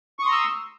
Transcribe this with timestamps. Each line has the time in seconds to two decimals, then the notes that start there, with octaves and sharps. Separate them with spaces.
0.19 C#6
0.22 D#6
0.26 C6
0.29 A#5
0.32 E6